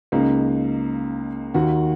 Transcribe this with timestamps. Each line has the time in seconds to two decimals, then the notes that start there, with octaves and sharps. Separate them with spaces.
0.12 C#2 C#3 A#3 D#4
1.54 D#2 D#3 A#3 F#4